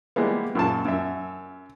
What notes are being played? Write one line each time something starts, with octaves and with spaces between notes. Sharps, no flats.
E3 G3 G#3 A#3 B3
F#2 A#2 A5
F#2 E5